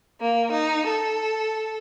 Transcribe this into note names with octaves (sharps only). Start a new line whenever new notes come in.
A#3
D#4
A4